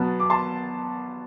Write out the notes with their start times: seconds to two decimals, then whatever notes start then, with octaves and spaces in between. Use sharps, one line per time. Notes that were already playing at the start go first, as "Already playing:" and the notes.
Already playing: B2 F#3 B3 A5
0.20 D6
0.30 A5 C6